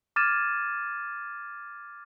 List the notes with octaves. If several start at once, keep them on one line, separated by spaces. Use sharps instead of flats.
D6 F6 G#6 A6 D#7 E7